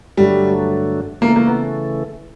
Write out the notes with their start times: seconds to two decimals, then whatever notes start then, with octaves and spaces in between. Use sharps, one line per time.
0.17 G2 D3 F#3 G3 A3
1.21 C#3 E3 A3 A#3
1.36 A#3
1.47 B3